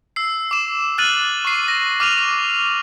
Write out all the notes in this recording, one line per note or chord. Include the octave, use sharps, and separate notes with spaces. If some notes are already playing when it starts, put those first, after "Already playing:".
E6 C7
D6 E7
F6 F#6 A6 D#7 F#7
C#6 C7
A#6
D6 F6 D#7 F7